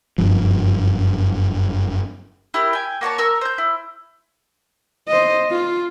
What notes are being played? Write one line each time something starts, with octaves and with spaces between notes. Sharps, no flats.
F#1 G2 F3
E4 G4 A#4 F6
G5 G#5
A#3 F#4 C#5 A5
A#4 E6
C5 G6
E4
C5 D#5
F4